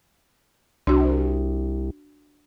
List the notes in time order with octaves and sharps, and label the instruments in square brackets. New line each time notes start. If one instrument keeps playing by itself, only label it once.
[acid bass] C2 [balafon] D4 F#4